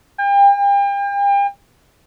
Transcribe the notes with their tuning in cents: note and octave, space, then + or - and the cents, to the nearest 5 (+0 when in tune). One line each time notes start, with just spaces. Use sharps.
G5 +40